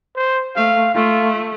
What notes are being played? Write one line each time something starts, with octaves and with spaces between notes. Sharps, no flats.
C5
A3 F5
A3 F4